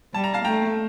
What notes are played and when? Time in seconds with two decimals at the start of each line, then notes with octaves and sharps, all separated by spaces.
0.14 G3 A5
0.24 A#5
0.34 F5 A5
0.45 A3 G5 A#5